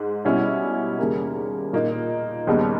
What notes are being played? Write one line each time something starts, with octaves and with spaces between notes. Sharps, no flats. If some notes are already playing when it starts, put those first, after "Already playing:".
Already playing: G#2 G#3
B2 G3 C#4 E4
D#2 C#3 G3 A#3
A#2 A#3 D#4
D#2 C#3 G3 B3 D#4